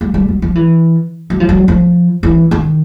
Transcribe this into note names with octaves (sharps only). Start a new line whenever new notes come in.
G3
G3
F#3
F3
E3
F#3
F3
F#3
F3
E3
D#3